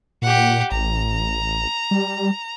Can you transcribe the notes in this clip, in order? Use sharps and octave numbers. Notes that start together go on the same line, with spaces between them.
A#2 G4 F#5
A1 A#5
G3